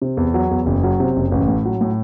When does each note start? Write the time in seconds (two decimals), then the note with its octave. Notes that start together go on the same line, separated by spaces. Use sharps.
0.02 C3
0.17 E2
0.34 F#3
0.51 E2
0.66 F#1
0.83 F#3
1.00 C3
1.16 F#1
1.32 A1
1.48 A2
1.65 F#3
1.81 A2